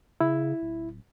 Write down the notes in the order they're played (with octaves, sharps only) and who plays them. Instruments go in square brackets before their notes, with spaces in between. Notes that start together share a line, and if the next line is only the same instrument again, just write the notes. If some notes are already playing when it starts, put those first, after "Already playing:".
[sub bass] C#3 [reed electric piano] E4
[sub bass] D1